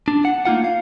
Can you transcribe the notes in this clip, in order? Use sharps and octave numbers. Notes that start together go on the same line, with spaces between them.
D4
F#5
A3 A#3 D#4 F4 F#5
F5